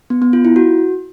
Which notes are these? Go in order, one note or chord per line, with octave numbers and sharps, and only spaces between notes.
B3
B3
F4
E4
F#4